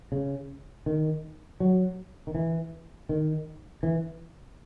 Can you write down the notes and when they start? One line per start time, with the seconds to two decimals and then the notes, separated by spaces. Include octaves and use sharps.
0.12 C#3
0.86 D#3
1.60 F#3
2.27 D#3
2.35 E3
3.09 D#3
3.83 E3